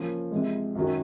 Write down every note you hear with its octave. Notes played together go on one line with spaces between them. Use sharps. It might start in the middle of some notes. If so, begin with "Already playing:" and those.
Already playing: F3 A#3 C#4
C3 F3 G#3
F#2 D#3 F#3 C#4